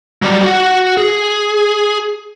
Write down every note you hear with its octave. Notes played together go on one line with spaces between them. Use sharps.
F#3 G3
F#4 F#5
G#4